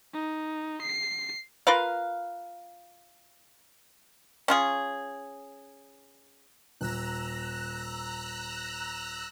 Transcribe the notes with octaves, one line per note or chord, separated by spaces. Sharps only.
D#4
C7
F4 A#4 B4 F5
C#4 F4 G#4
D#1 A#5 E6 F#6